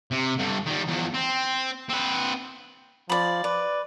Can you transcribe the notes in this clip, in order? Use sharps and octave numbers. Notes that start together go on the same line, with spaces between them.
C3
G2 D3
D#3 G3
E2 F3
C4
C4 B4
F3 D5 B5
B4 D5